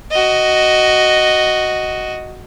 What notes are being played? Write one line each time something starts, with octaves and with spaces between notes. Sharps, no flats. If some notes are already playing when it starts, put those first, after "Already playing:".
F#4 D#5